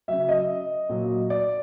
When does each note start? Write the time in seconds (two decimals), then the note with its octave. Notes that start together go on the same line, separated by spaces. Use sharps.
0.08 C#3 F#3 E5
0.29 D#5
0.89 A#2 F#3
1.30 D5